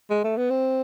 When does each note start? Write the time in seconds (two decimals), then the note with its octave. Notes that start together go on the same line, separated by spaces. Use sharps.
0.10 G#3
0.24 A3
0.37 B3
0.50 C4